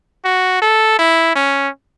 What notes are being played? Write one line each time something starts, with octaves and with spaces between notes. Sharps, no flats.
F#4
A4
E4
C#4